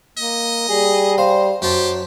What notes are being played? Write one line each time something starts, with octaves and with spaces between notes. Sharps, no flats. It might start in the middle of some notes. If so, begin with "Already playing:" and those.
A#3 D#5
G3 G#4
C5 F5
F#2 F#3 G4 C5 A5